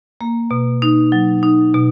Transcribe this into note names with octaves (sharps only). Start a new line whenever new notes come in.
A#3
B2
D#4
F#3
D#4
B2